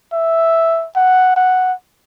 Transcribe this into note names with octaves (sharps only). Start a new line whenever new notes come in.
E5
F#5
F#5